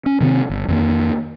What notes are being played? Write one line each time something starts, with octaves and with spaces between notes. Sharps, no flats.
C#4
C3 D#3 B3 C4
G1
F2 D#3 A#3